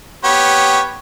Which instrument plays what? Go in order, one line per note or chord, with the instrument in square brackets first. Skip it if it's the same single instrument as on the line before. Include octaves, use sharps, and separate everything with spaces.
[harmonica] B3 G4 C#5